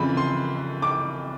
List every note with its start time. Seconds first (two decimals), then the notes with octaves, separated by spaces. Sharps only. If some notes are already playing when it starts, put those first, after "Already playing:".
Already playing: F2 C#3 E3 B5
0.17 C6
0.82 D6